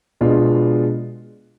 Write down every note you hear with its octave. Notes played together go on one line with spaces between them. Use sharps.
B2 G#3 B3 D4 F4